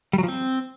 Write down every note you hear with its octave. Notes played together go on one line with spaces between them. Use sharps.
G3
F#3
F3
C4